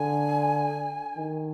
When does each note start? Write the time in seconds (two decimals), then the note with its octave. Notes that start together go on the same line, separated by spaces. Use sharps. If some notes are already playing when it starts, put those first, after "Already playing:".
Already playing: D3 G#5
1.17 D#3